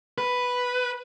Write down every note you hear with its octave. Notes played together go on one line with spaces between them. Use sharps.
B4